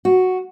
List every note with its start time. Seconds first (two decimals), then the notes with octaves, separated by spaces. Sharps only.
0.05 F#4